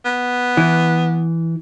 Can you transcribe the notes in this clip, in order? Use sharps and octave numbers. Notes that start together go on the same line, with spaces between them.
B3
E3